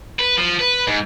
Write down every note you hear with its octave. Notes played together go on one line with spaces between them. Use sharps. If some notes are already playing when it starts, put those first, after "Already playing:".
B4
F3
B4
G#2